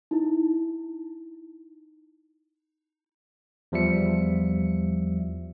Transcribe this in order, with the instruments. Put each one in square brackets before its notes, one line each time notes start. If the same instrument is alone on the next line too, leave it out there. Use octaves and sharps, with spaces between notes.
[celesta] D#4 E4
[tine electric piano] E2 F3 G3 E5 C#7